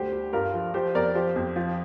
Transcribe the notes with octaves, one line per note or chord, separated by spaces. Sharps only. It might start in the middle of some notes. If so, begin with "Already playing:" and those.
Already playing: D2 G3 G4 C5
G3
G2 F4 A#4
F3
F3 G4 C5
F2 A#4 D5
F3 G4 C5
F2
F3